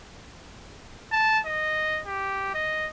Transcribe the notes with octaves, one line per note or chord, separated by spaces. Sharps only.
A5
D#5
G4
D#5